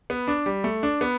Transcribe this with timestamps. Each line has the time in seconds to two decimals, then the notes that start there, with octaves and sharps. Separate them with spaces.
0.10 B3
0.28 D4
0.46 G3
0.64 A3
0.83 D4
1.01 B3